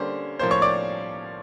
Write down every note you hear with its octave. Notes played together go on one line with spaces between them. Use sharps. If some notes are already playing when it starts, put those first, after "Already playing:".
Already playing: D3 G3 A#3 C#4 C5
A2 F3 A#3 C#4 C5 C6
C#5 C#6
D5 D6